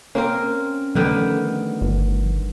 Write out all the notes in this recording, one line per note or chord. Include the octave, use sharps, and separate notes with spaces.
A#3 C4 C#4 A#4
D3 D#3 F3 G3 A3 B3
G1